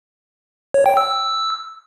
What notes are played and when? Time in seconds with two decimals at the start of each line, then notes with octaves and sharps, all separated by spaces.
0.74 C#5
0.86 G5
0.97 E6
1.08 E6